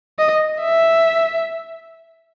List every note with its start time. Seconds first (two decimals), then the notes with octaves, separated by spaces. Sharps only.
0.19 D#5
0.62 E5